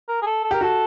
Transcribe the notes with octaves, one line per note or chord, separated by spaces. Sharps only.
A#4
G#4
A4
A4
G4 A#4
F#4 A4